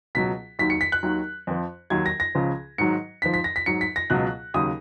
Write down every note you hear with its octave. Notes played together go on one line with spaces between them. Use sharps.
C#2 B2 F#3 B6
D#2 D#3 F#3 B6
C#7
B6
F#6
D#2 D#3 F#3
F2 F3
D#2 D#3 F#3 G#6
A#6
A#6
C#2 C#3 F3
G#2 D#3 F#3 C#7
G#2 F3 B6
B6
A#6
B6
G#2 F#3 C#7
B6
A#6
C#2 B2 F#3 F#6
D#2 C#3 F#3 D#6